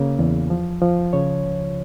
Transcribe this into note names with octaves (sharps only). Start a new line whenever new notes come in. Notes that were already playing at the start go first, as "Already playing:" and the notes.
Already playing: C#3 A#3
E2
F3
F3
C#3 C#5
C#2